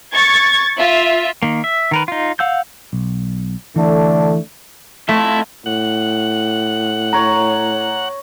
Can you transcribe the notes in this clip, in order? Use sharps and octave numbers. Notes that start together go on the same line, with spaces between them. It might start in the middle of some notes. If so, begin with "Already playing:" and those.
C#6 G#6 A6
F4 E5
D#3 A#3
E5
D#3 A#4 B4
D#4 F4
F5 F#5 E6 G6
B1
D3 E3 A3 D4
A3 E4 F4 A4
A2 F#5
C#5 A#5